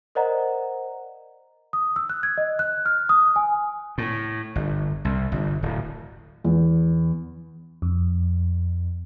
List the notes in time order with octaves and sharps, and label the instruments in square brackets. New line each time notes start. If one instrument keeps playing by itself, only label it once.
[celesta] A#4 C5 D5 D#5 F#5 A#5
D#6
E6
F#6
G#6
D#5
F#6
F6
D#6
G#5
[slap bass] A2
G1
C2
G1
D1
[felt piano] E2
[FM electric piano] F2